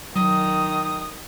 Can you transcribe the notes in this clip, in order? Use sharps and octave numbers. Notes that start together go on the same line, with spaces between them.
D#3 F#3 D#6